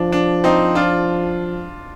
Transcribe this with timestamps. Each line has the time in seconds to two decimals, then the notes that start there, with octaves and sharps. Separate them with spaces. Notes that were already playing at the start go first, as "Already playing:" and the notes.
Already playing: F3 D4
0.12 D4
0.44 C4 D#4
0.75 D4 F4